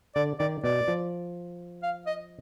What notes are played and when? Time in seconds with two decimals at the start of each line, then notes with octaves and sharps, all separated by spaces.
0.16 D3 D5
0.39 D#3 D5
0.64 B2 D5
0.88 F3
1.83 F5
2.07 D#5